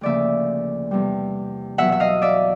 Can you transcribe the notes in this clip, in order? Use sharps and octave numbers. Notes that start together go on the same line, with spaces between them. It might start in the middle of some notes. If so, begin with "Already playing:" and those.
D2 C#3 F3 A#3 D5 E5
E2 C3 E3 G3
E2 B2 F#3 E5 F#5
E5
D#5 F5
D5 E5